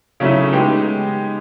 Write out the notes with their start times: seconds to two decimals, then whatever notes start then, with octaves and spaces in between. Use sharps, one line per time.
0.20 C#3 F#3 A3 C#4 E4
0.53 G#3 B3 D#4 G4